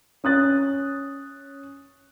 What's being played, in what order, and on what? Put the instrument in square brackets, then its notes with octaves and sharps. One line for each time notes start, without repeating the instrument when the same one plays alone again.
[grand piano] C#4 D#6 F#6 A6